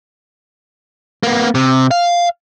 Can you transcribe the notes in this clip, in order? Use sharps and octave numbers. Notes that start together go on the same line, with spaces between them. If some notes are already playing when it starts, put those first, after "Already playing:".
A#3 B3
C3
F5